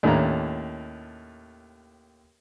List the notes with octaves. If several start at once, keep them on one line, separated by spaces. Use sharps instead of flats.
D#2 A2 C#4 D4 E4 A#5